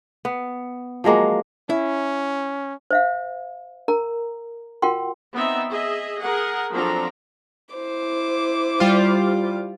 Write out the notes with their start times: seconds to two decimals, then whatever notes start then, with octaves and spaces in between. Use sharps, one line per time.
0.25 B3
1.04 F3 F#3 G#3 A#3
1.70 C#4 E4
2.91 C5 E5 F5
3.88 A#4 A#5
4.82 F4 F#4 A#4 F#5 G5 C6
5.34 B3 C4 D#4 E5
5.71 G#4 D#5 E5
6.20 G#4 A#4 F#5
6.73 F3 F#3 C4 D4 A4 A#5
7.75 E4 C5 D6
8.80 G3 F4